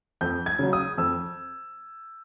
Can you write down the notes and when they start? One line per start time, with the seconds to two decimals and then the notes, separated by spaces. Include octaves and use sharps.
0.21 F2 G6
0.46 G#6
0.59 C#3 F#3
0.73 D#6
0.98 F2 E6